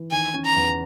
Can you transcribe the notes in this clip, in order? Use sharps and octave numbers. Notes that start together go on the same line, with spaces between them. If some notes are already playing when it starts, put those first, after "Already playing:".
Already playing: E3
D#3 G#5
C#4
A#5
E2